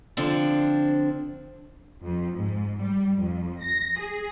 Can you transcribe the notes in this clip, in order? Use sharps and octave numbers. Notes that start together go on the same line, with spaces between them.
D3 F3 C4 D4
F2
G#2
G3
F2
A#6
G#4